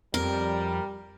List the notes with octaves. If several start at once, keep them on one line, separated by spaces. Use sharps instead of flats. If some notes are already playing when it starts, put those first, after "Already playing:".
F2 G3 A#4